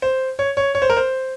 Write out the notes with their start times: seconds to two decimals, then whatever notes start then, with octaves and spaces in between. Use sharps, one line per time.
0.02 C5
0.39 C#5
0.57 C#5
0.75 C#5
0.82 C5
0.90 A#4
0.97 C5